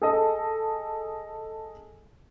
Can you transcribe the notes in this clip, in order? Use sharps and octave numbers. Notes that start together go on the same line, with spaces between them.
G#4 A4 D#5